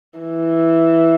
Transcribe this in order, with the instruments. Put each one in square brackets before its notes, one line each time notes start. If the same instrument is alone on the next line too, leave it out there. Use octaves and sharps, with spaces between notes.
[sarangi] E3